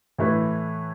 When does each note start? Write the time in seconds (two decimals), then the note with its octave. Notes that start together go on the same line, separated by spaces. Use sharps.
0.18 A2 E3 A3 E4 B4